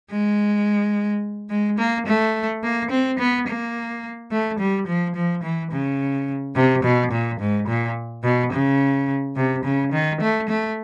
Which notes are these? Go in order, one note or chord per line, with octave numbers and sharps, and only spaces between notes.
G#3
G#3
A#3
A3
A#3
C4
B3
A#3
A3
G3
F3
F3
E3
C#3
C3
B2
A#2
G#2
A#2
B2
C#3
C3
C#3
D#3
A3
A3